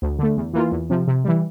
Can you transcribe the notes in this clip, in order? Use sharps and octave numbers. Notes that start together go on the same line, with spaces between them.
D2
D3 A3
E2
E3 A#3 F4
E2
C3 F3
C3
E3 G3